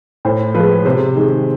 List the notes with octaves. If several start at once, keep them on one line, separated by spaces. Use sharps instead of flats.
A2 C5
F3 G#3 B4
C3 C5
D#3 G#3